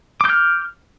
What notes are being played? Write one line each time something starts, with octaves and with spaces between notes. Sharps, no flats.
D6 F6 G6